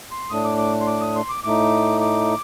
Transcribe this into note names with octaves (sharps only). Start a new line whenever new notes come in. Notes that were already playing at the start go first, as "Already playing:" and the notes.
C6
A2 A3 D4 D#6
D6
D6
C6
D6
D#6
C6
D6
A2 A3 D#4 D6
D6